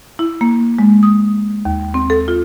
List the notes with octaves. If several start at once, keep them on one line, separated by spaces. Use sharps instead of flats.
E4
A#3
G#3
D#6
D#2
C4
A4
F4